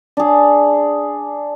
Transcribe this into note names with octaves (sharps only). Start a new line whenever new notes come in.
D4 G#4